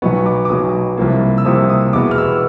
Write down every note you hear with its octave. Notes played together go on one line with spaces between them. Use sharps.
B1 B2 F#3 B3 C#6
D6
D6
B1 B2 F#3 B3 D#6
C2 C3 F3 A#3
E6
C2 C3 F3 A#3 D#6
D#6
E2 B2 G#3 B3 D6
F6
E6